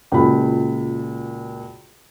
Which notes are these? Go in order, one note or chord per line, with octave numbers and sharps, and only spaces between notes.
C#2 A#2 F#4 B5